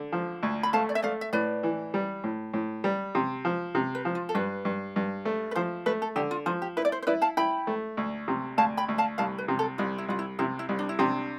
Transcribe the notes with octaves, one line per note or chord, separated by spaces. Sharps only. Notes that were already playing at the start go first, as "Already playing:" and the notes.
Already playing: D3
F3
D2
B5
A3 F5 A5
D5
E5
A3 D5 F5
E5
A2 B4 D5
E3
G3
A2
A2
G3
C3
F3
C3
B4
F3
F4
A4
G2 B4
G2
G2
A3
B4
F3 C5
A3 B4
A4
D3 G4
F4
F3 F4
G4
E4 B4
D5
C5
C5
E4 B4 D5
F5 A5
E4 G5 B5
A3
D2
C3
D2 F5 A5
G5 B5
D2
F5 A5
C2 F5 A5
B4
C3
A4
C2 F4
E4
C2 F4
E4
C3 E4
E4
C2
D4
E4
C3 D4